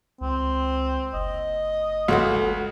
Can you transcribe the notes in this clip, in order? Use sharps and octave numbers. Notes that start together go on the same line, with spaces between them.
C#2 C4
F#1 D#5
C#2 F#4 A4 F#5